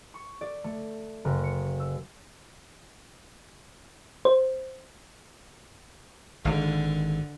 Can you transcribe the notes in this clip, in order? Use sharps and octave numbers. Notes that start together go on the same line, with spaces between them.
C#6
D5
A3
F#1
C#7
E6
C5
G#1 D3